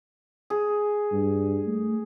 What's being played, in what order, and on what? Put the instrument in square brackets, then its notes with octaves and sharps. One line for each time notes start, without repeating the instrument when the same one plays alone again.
[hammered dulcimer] G#4
[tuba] G2
A3